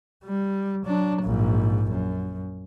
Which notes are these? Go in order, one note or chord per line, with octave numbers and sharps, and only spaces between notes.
G3
F#3 D4
A#1 G#2
F#2